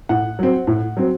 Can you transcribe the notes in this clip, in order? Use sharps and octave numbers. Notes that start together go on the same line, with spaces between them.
A2 F#5
F#3 C4
A2
F#3 C4